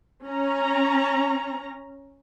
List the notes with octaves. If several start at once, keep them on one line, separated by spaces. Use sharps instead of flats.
C#4 A#5